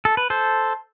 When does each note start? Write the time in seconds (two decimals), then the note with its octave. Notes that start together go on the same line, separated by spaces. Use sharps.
0.05 A4
0.17 B4
0.30 A4 C5